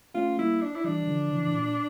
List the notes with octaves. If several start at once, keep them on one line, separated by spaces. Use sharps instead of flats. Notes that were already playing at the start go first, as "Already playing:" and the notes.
A3 C#4 F4
G3 A#3 E4
D4
E4
E3 G3 D4
E3
D3 F3
C#3 E3
A2
A#2